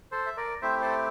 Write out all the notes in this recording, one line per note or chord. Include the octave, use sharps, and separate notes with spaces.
A4 C5
E5
A#4 D5
A3 C4 E4 G4 C5 E5
A4 C5